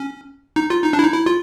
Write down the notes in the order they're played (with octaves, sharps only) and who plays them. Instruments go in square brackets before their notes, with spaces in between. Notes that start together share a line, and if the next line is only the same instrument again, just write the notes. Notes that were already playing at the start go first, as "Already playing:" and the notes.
Already playing: [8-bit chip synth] C#4
D#4
F4
D#4
D4
E4
D#4
E4
F4